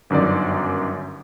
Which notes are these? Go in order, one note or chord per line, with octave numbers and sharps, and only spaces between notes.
G1 F#2 D#3 D5